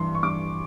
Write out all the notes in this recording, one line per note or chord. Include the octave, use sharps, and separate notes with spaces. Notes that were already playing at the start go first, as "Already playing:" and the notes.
Already playing: G2 E3 C6
C#6
G2 D6